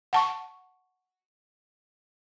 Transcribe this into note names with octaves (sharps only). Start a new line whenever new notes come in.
F#5 A5 C#6